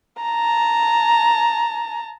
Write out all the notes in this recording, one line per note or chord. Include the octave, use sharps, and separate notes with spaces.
A5 A#5